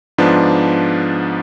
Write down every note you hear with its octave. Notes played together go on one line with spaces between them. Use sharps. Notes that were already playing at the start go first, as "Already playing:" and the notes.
G#2 F3 B3 D4